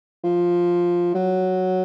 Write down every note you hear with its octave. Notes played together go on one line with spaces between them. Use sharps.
F3
F#3